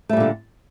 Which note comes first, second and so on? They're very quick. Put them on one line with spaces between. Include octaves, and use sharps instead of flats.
A3 G3 A#2 D3